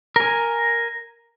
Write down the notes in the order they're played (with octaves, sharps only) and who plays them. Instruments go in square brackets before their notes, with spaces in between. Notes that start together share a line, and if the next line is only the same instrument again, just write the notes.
[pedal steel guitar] A#4 G#5